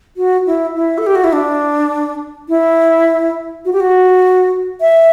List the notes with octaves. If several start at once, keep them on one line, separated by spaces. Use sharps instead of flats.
F#4
E4
E4
A4
G4
F#4
E4
D4
E4
F#4
G4
F#4
E5